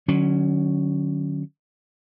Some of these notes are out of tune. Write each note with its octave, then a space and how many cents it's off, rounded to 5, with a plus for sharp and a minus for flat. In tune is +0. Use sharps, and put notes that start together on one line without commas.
D3 +40 F#3 +0 C#4 +0